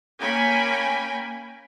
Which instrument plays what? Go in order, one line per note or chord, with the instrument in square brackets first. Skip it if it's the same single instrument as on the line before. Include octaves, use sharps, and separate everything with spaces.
[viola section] A#3 C#4 G5 G#5 B5